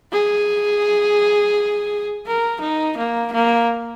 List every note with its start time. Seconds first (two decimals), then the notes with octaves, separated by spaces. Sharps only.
0.12 G#4
2.27 A#4
2.61 D#4
2.98 A#3
3.33 A#3